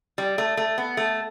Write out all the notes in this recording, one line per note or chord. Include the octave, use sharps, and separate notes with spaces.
G3
A3
A3
B3
A3